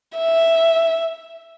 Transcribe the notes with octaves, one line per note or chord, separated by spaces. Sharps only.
E5